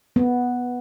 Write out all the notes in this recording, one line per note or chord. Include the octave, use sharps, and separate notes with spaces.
B3